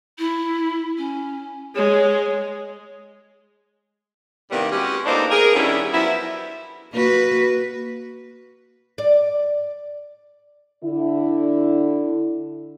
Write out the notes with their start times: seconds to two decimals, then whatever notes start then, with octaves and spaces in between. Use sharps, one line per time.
0.18 E4
0.98 C#4
1.76 G#3 C#5
4.51 A2 C3 D#3 G3 A#3 B3
4.71 G#3 C#4 F#4 G4
5.06 F2 A#3 B3 D4 D#4 C5
5.31 G#4 A#4
5.54 D3 D#3 G3 B3 C#4 E4
5.94 F3 F#3 B3 E4
6.92 A#3 F#4 B4
8.98 D5
10.84 D3 E4